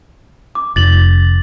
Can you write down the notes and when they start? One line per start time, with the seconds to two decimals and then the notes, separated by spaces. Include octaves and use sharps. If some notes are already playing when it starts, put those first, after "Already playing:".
0.55 D6
0.76 F1 A6 F#7